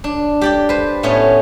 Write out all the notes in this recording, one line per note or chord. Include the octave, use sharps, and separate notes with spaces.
D4
G4 D5 G5
B4 C5
A2 A3 B3 C#4 C#5